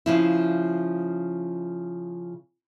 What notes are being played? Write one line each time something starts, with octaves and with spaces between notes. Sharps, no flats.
C#3 F3 E4